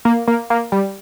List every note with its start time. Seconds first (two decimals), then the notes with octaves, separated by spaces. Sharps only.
0.05 A#3
0.28 A#3
0.50 A#3
0.72 G3